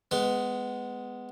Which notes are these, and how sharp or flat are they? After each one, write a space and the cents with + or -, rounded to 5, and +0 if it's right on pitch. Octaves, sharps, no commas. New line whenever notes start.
G#3 +0 B3 +15 C6 +25